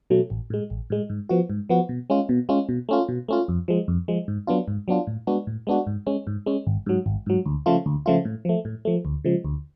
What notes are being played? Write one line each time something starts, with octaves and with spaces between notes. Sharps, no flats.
B2 F#3 A3
A1
A2 G#3
A1
A2 G#3
G#2
F3 B3 F#4
G#2
F3 B3 F#4
B2
G#3 C#4 F4
B2
G#3 C#4 F4
B2
A3 C#4 F4
B2
A3 C#4 F4
F2
F3 G#3
F2
F3 G#3
G#2
F#3 B3 D4 F4
G#2
F#3 B3 D4 F4
A2
G#3 B3 D4 F#4
A2
G#3 B3 D4 F#4
G#2
G#3 C#4
G#2
G#3 C#4
G#1
G#2 F#3
G#1
G#2 F#3
D2
C#3 F3 A3 F4
D2
C#3 F3 A3 F4
A2
F3 A3
A2
F3 A3
D2
C#3 F3 G#3
D2